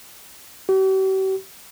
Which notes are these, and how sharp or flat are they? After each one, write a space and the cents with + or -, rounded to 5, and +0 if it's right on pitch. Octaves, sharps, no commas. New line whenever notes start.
G4 -45